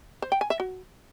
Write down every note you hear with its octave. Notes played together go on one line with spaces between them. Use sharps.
C5
G5
G#5
E5
F#4